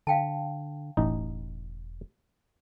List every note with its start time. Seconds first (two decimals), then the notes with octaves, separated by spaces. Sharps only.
0.07 D3 F5 G5 A5
0.97 E1 A1 D#4